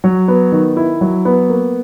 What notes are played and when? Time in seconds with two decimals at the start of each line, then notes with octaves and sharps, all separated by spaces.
0.04 F#3
0.28 B3
0.52 D#3
0.77 E4
1.01 F#3
1.25 B3
1.50 A#3